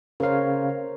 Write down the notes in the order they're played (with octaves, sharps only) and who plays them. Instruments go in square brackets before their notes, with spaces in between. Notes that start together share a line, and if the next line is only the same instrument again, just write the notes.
[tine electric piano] C#3 F5 [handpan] A#4 C5 C#5